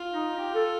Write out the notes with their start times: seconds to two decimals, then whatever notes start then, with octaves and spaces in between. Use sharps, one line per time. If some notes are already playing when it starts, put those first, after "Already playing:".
Already playing: F4
0.13 D#4
0.37 G4
0.55 A4